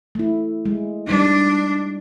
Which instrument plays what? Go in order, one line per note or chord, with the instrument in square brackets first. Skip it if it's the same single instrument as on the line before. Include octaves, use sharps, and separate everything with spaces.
[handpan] A3 E4
G#3
[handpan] G3 D#4 [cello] D4